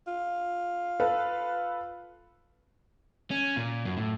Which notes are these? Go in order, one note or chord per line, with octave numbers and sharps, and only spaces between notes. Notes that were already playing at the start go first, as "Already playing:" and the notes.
F4
A4 B4 F5
C#4
A#2
F#2
A2